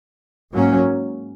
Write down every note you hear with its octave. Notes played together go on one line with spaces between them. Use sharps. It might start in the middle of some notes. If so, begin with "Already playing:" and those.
G#2 F#3 A#3 C#4